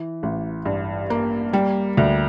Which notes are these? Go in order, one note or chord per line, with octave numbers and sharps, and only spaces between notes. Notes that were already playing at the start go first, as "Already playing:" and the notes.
Already playing: E3
A1
G2
A#3
G3
D2